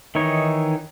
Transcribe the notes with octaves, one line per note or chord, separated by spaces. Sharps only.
D#3 E3 D#4 C#5